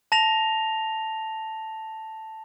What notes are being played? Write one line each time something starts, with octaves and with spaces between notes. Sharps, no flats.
A5 A#6 F7